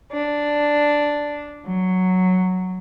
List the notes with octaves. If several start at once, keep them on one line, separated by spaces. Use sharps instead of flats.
D4
F#3